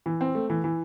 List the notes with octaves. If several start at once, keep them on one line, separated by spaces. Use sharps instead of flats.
E3
C4
A3
E3
E3